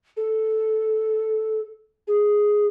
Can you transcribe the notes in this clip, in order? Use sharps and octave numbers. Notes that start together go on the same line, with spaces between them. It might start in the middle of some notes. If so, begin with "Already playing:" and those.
A4
G#4